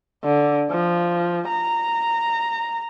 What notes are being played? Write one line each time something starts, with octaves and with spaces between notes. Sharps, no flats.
D3
F3
A#5